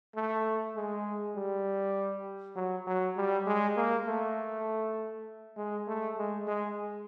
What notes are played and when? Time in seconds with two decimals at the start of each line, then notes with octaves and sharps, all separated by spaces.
0.15 A3
0.76 G#3
1.36 G3
2.56 F#3
2.87 F#3
3.17 G3
3.47 G#3
3.77 A#3
4.07 A3
5.57 G#3
5.88 A3
6.18 G#3
6.48 G#3